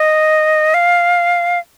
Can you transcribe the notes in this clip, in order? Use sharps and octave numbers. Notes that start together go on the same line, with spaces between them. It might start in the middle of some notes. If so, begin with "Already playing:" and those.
Already playing: D#5
F5